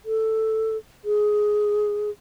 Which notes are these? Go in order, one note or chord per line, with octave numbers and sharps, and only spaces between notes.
A4
G#4